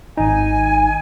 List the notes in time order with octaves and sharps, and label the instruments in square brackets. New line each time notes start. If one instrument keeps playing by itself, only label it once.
[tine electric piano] G#1 D#4 [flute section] G#5